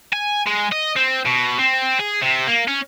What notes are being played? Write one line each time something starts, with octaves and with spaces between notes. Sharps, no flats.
G#5
G#3
D#5
C4
B2
C4
G#4
C3
A#3
C#4